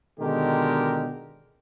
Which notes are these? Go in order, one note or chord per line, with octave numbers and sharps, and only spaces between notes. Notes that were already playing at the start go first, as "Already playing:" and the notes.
B2 D3 D#3 G#3 G4 A#4